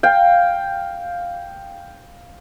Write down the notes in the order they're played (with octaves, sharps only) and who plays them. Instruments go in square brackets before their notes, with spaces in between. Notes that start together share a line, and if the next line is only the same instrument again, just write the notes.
[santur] F5 G5